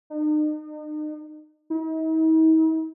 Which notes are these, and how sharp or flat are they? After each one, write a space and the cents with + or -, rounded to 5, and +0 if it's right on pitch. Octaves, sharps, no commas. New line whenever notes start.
D#4 -40
D#4 +45